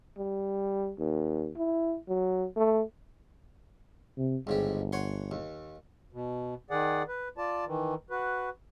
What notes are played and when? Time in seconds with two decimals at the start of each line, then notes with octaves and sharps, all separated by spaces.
0.18 G3
0.99 D#2
1.57 E4
2.09 F#3
2.57 A3
4.18 C3
4.47 G1 C#2 G#2 G4
4.93 C#5 F#5 C6
5.31 D#2
6.13 B2
6.70 D#3 G#4 D5 F#5
7.08 B4
7.38 F4 D5 A5
7.66 D#3 E3
8.10 F#4 B4